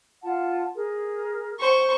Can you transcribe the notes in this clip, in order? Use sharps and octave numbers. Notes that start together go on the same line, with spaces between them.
F4 F#5 A5
G#4 A#4
C5 C#6